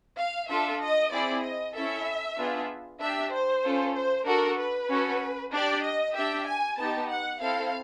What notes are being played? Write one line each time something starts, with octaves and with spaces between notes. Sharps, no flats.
F5
D4 F4 A4 E5
D#5
C4 E4 G#4 D5
D#5
C#4 E4 A4 E5
B3 D4 F4 G#4
D4 G4 E5
C5
C#4 F4 A4
C5
D4 F#4 A4 A#4
B4
C#4 F#4 A4
D4 G4 D5
D#5
D4 G4 E5
G#5
B3 D#4 G4 A5
F#5
C4 E4 A4 F5